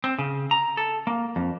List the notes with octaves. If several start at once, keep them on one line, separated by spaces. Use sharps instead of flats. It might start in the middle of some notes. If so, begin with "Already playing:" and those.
C4
C#3
A#5
A4
A#3
F2